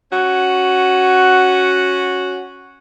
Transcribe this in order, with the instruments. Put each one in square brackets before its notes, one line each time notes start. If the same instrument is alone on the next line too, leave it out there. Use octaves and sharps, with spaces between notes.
[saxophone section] C#4 F#4